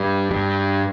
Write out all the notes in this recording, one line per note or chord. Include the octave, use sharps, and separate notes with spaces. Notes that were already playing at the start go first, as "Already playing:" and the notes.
Already playing: G2
G2